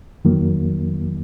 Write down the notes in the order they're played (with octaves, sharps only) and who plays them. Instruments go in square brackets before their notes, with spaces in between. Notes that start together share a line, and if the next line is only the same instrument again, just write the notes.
[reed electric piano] F2 D#3 F#3 A#3